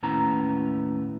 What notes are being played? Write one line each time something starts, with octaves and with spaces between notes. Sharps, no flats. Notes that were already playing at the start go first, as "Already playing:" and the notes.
D#2 A2 B3 C#4 E4 A#5